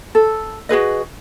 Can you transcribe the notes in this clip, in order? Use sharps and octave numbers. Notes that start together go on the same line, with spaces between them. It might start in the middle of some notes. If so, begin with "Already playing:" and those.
A4
F#4 G#4 B4 D#5